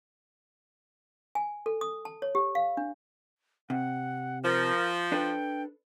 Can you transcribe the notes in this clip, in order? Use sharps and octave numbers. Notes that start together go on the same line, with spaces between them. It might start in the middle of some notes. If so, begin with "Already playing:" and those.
G#5
A4
D#6
A5
C#5
G4
F5
D4
C3 F#5
F3 A#4
D4 A4 B4 G5